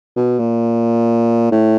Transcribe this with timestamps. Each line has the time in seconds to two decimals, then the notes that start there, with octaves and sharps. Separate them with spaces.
0.16 B2
0.39 A#2
1.52 A2